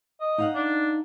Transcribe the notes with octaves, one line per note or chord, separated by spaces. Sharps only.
D#5
D#4 F5 F#5
D4